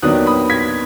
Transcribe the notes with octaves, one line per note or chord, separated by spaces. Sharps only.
D#2 D#3 F#3 B3 D4 D#6 F#6
B5 D#6
G#6 B6